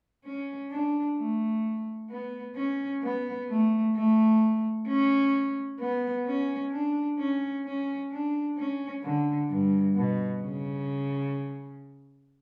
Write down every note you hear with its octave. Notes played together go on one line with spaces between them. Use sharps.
C#4
D4
A3
B3
C#4
B3
A3
A3
C#4
B3
C#4
D4
C#4
C#4
D4
C#4
D3
G2
B2
C#3